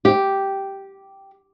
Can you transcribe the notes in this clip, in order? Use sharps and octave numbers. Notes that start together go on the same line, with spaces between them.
G4